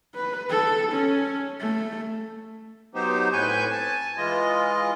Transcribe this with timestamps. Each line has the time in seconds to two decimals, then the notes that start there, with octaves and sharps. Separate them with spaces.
0.15 B4
0.50 A4
0.92 C#4
1.60 A3
2.95 F#3 B3 D#4 G4 C5
3.33 A2 C4 B4 G#5 C#6 G6
3.71 G#5 A5
4.18 E3 G#3 F4 D#5